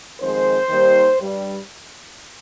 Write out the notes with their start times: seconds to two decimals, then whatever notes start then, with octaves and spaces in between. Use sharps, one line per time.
0.21 F2 D#3 G#3 C5
0.69 D#2 D#3 G3
1.19 G2 G3